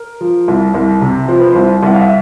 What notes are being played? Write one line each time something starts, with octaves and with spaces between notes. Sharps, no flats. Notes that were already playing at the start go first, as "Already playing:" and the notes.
Already playing: A#4
F3
C2
C2
C3
F3 C5
B4
C5
C2
C2 F#5
F5
E5